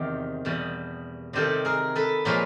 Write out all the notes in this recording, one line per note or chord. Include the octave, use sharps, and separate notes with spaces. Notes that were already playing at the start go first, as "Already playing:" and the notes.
Already playing: E2 C3 D#3 F4 G4
E2 B2 G3
C3 D#3 G3 G4 A4
G#4 A#4
A4 B4
A#2 F3 G#3 B4 C#5